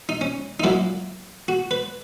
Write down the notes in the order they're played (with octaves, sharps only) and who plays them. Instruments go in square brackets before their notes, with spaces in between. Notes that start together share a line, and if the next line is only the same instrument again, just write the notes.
[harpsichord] D#4
C#4
D#4
A#2 F#3 A#3 E4
F#4
B4